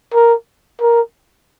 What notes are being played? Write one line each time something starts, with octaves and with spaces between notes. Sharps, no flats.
A#4
A#4